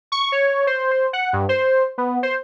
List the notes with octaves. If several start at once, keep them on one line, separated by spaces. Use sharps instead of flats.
C#6
C#5
C5
C5
F#5
G2
C5
B3
C5